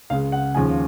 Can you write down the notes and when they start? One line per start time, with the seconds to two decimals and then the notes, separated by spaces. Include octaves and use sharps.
0.10 C#2 C#3 G#3 F5
0.32 F#5
0.55 D#2 C#3 F3 G#3 G#5